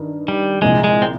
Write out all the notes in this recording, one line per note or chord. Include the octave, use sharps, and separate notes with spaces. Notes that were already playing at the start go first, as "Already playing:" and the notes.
Already playing: G2 D#3
G3
C2 A#2 F3 G#3
G#3
C4